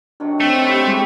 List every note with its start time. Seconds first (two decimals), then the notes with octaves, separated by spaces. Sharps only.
0.20 C3 D#3 F#3 D4
0.40 A3 C4
0.63 E4 G4 F#5 G5
0.87 G#3 G4 A4 C#5